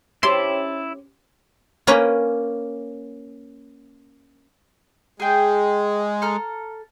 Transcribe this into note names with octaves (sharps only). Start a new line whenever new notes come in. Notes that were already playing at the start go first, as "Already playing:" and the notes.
C#4 E4 G4 E5 A5 C6
A#3 C#4 B4 A#5
G#3 G#4 G5
A4 A#5 F6